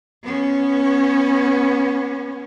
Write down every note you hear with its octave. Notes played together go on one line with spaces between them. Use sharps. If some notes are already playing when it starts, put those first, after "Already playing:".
B3 C#4